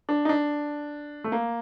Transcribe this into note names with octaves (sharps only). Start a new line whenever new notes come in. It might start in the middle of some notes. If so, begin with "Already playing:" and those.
D4
D#4
D4
A3
A#3